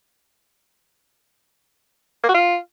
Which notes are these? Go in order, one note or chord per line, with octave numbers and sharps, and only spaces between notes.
A#3
F#4
F4